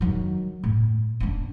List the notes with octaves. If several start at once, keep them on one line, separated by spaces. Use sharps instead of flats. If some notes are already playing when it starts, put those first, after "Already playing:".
D#3 F#3
A2
C#4 D4